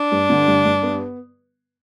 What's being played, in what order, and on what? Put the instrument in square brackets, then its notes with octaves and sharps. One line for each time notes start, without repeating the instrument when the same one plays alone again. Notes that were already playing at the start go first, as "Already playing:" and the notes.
Already playing: [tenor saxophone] D4
[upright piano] G2
D3
G2
G2
B3